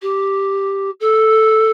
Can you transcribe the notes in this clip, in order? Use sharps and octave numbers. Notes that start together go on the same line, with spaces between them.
G4
A4